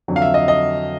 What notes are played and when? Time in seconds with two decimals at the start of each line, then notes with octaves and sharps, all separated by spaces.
0.08 F2 D3 F#3
0.16 F5
0.22 E5
0.34 D#5
0.48 D#5